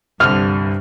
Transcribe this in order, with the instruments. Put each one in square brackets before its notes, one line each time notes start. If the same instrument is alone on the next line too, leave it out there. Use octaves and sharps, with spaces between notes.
[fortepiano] C2 D3 [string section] G2 [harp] F6